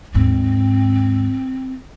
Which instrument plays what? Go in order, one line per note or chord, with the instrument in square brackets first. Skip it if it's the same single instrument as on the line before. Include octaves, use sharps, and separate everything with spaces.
[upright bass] D#2 G#2 [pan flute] C4